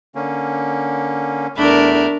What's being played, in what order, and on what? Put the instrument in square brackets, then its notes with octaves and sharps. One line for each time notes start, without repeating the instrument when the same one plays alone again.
[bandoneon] D3 A#3 C#4
[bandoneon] E2 A3 B5 [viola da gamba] D4 A#4